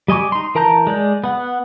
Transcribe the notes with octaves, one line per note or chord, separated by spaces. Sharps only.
G3 D#5 G#5 C#6 D6
D#4 C6
E3 A#4 A5 A#5 G6
G#3 D5 G6
B3 F#5